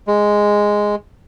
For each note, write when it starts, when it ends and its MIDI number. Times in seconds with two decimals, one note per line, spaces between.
0.07 0.95 56